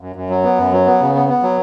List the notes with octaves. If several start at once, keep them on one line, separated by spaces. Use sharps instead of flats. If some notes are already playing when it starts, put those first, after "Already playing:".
F#2
F#2
F#3
B3
F#2
F#3
B3
C#3
B3
B3
F#3